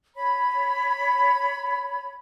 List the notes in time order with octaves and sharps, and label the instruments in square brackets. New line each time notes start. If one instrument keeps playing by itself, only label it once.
[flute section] C#5 B5